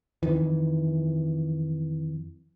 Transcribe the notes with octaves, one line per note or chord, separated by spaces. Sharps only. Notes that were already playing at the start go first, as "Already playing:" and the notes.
F2 D#3 E3